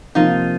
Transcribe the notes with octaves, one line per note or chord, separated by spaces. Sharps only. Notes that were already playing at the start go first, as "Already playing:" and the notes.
C3 F3 A#3 D#4 F4